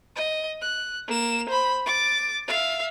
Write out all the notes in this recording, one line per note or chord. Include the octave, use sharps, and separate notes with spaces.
D#5
F#6
A#3 E7
C5 B5
D6 A6
E5 F5